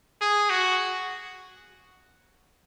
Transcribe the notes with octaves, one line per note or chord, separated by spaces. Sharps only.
G#4
F#4